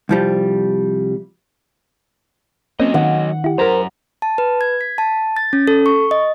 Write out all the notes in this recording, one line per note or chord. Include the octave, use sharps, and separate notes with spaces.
C2 F3 G3
F#3 A#3 C4 C#4 D#5
D#3 F#5
E4 G4
F#2 A#4 C5 A#5
A5
B4
G#6
B6
A5
A6
C#4
A4
C#6
D#5